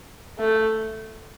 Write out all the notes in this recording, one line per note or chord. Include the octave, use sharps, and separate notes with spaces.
A3